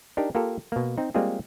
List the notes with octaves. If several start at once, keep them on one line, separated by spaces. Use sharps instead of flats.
D4 D#4 G4 A#4
A#3 F4 G4 A4 A#4
B2 A#3
C4 D#4
G3 G#3 A#3 C4 F4 G#4